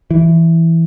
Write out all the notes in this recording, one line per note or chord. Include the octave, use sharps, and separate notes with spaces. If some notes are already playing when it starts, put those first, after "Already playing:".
E3